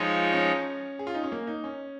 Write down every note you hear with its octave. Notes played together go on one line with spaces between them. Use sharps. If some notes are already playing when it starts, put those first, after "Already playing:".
Already playing: F3 G#3 D#4 F4 C#5
C#4
G#4
F4
D#4
C#4
A#3
D#4
C#4